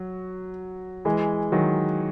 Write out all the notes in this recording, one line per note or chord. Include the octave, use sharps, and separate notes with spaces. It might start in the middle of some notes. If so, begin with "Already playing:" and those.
Already playing: F#3
E3 G#3
D#3 F#3